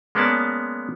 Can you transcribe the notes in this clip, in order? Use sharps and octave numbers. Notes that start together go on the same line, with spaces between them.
G#3 A#3 B3 C#4 D5 A5